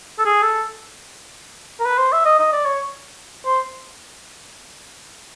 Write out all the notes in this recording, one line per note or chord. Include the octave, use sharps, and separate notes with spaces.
A4
G#4
A4
A#4
B4
C5
E5
D#5
D#5
D5
C#5
C5